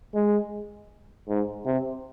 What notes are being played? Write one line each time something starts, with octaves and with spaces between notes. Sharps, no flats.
G#3
G#2
C3